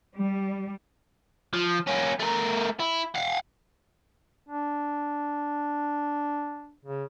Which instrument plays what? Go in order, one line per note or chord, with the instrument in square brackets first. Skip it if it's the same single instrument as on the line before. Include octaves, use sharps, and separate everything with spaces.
[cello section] G3
[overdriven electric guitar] F3
A#3 C#4
A3 A#4
E4
F5 F#5
[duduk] D4
C#3